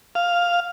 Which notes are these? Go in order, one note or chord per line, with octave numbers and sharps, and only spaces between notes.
F5